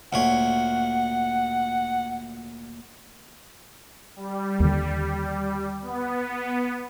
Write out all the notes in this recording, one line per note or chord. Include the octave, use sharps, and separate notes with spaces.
D2 A#2 C#5 F#5
G3
D#2 D3
B3